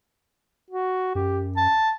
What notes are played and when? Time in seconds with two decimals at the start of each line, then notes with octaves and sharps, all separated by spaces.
0.70 F#4
1.15 F#2 G4
1.57 A5